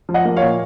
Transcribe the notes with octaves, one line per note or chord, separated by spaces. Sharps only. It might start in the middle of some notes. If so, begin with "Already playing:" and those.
F3
D#5 F#5
A#3
C#5 F5
A#2